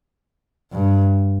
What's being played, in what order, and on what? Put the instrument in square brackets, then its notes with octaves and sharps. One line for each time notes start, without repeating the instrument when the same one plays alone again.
[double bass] G2